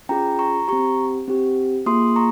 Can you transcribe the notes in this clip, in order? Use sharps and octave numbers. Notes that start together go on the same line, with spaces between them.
C#4 F4 G#4 G5 A#5
A#5 C#6
C4 G4 A#5 C#6
C4 G4
A#3 F4 G#4 C6 D#6
A#5 C#6